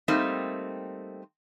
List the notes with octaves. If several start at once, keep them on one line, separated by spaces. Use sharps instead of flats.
G3 A3 A#3 C4 D#4